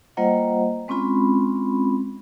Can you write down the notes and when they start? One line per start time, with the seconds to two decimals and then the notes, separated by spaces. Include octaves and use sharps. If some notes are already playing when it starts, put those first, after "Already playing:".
0.17 G3 A#3 F4 C5 D#5 F#5
0.88 G#3 C4 C#4 F4 B5